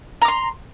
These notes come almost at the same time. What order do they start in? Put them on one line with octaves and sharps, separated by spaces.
A#5 D6 C6